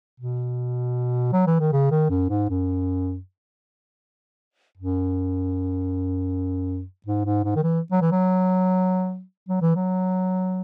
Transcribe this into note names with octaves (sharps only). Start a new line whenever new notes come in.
B2
F#3
E3
D#3
C#3
D#3
F#2
G#2
F#2
F#2
G#2
G#2
G#2
D#3
E3
F#3
E3
F#3
F#3
E3
F#3